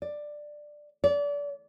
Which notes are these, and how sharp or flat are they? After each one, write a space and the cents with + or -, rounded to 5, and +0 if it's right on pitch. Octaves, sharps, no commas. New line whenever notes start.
D5 +10
D5 -30